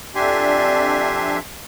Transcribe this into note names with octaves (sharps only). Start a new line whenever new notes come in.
F2 D4 G4 D5 E5 G#5 C6